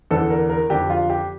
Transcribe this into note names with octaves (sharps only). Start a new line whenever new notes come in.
E2 D3 A4
A#4
A#4
F2 D3 G4
F4
G4